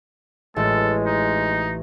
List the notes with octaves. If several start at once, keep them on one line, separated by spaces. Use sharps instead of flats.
A1 G#3 A4
D#4